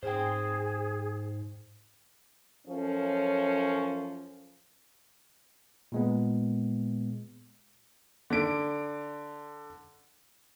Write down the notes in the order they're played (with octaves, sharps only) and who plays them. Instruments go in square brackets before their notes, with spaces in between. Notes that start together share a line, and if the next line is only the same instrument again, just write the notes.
[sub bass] G#2 [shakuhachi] G#4 [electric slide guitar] C5 G5
[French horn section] F#2 F3 C#4 A4
[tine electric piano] A#2 G#3 B3
[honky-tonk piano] D3 D7